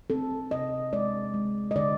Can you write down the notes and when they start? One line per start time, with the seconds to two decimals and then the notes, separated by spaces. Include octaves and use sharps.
0.10 C4 A4
0.51 C3 D#5
0.92 G#3 D5
1.34 G#3
1.71 D#5
1.76 D3 D5